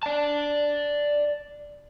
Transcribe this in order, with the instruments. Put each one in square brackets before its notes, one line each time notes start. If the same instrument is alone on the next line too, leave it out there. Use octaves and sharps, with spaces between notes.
[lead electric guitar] D5 A5